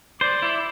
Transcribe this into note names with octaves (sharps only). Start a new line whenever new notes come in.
C5 D5
E4